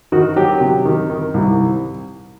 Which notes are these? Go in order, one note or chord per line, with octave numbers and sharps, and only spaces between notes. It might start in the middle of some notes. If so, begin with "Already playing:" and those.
D#3 F#4
F#3 G4
C3
D#3
D#3
C2